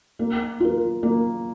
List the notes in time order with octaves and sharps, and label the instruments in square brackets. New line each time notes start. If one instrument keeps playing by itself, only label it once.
[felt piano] A#3
F4 A#4
A#3